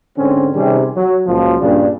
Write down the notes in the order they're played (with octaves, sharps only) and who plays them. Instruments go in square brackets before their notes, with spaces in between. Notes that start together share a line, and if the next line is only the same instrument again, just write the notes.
[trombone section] G#2 D3 C4 C#4
C3 D#3 G3 C#4 G#4
F#3
C#2 A#2 F3 F#3
G2 A#2 C#3 D4